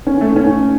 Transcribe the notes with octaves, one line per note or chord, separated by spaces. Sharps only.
C#4
A3
C#4